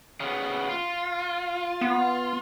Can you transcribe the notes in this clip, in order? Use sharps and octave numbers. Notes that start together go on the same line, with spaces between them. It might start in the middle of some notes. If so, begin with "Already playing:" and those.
C#3 B3
F4
B3